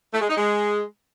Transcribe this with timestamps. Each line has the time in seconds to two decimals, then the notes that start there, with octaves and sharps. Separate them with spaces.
0.13 A3
0.21 G#3
0.29 D#4
0.37 G#3